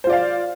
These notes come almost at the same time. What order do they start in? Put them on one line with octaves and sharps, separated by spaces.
C5 F4 D5 F5